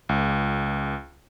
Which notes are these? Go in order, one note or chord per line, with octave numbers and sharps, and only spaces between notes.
C#2